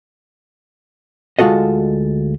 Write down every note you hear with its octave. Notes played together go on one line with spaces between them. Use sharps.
D2 G#3 F4 F#4 A4 D#5